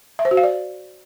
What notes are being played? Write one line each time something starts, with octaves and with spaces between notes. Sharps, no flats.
E5
C5
F#4
F5
D5